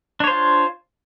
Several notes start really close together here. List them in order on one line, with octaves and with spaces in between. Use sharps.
D4 C#5 C5 F4